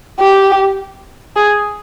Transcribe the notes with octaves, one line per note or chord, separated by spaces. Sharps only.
G4
G#4